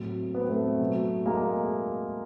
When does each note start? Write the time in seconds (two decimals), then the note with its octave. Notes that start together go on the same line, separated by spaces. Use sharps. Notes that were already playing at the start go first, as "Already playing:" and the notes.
Already playing: A2 F#3 A#3 C4
0.35 B3
0.42 C4
0.50 A3 B3
0.79 B2 F#3
1.26 G#3 A#3